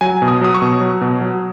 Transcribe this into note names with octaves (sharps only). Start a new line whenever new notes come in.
F#3 G#5
B2
D#6
F#3 D#6
C#6
B2
F#3
B2
F#3